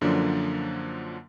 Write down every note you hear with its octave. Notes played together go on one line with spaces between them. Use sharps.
F#2 D3 F3 F#3 A#3 D4